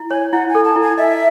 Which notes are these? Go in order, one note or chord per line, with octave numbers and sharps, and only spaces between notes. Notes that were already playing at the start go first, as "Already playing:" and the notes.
Already playing: E4
C#5 G#5
E4 F#5
G#5
A4
A5
E4
G#5
D#5 E5